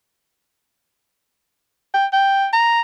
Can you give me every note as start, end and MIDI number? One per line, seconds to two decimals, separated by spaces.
1.94 2.06 79
2.13 2.47 79
2.53 2.81 82